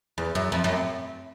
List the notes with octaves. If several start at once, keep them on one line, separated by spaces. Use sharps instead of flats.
E2
F#2
F2
F#2